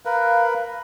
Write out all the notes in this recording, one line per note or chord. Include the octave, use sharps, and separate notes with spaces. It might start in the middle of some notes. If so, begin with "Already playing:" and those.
A#4 B4 F5